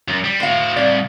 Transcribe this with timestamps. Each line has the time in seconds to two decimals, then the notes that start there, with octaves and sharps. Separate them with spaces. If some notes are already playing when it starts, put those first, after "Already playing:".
0.08 F#2
0.24 G3
0.40 A2 F#4 C5 F5
0.76 C2 D5